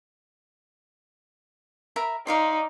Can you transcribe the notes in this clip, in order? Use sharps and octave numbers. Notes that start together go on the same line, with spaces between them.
A#4 E5 B5
D#4 D5 F5 C6